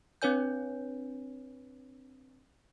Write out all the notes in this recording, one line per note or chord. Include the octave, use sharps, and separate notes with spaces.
C4 D4 B4 C#5 G#5 G6